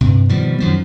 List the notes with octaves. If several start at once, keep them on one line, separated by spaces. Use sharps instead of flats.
G2 C3
B2 D#3 F3 G3
F#2 D#3 F3 F#3